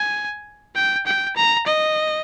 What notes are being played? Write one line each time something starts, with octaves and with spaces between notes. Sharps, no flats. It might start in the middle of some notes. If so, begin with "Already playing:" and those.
Already playing: G#5
G5
G5
A#5
D#5